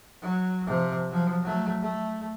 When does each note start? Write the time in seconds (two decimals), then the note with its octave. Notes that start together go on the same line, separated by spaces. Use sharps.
0.22 F#3
0.66 C3 F3
1.09 F3 F#3
1.43 F#3 A3
1.82 A3